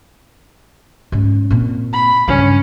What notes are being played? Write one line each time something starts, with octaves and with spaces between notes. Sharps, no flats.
G#2 C#4
A#2 C4
B5
G2 C#3 C#4